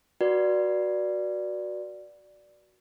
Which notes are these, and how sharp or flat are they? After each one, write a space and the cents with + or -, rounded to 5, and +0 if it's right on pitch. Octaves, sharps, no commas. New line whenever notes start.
F#4 +0 B4 -35 D5 +0